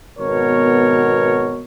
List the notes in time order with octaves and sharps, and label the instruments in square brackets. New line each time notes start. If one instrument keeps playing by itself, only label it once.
[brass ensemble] G#1 B2 B3 A#4 C#5